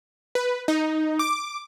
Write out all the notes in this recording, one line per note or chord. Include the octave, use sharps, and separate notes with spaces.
B4
D#4
D6